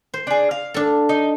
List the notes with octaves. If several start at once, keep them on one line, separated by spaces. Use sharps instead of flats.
C5
D4 G#4
F5
D4 A4
D#4